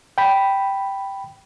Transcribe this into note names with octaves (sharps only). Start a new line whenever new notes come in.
G5 B5